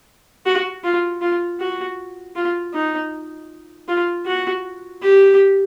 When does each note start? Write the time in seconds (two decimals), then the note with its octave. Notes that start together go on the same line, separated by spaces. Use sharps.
0.46 F#4
0.84 F4
1.21 F4
1.60 F#4
2.35 F4
2.74 D#4
3.88 F4
4.26 F#4
5.02 G4